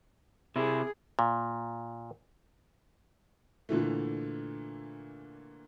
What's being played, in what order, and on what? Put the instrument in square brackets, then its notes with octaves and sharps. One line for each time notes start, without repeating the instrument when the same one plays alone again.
[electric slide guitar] C3 E4 [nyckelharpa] G#4
[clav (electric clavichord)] A#2
[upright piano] A#2 D3 E3 A3